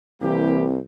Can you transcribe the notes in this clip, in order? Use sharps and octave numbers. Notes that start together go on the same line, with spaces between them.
C2 E3 A#3 C4 G4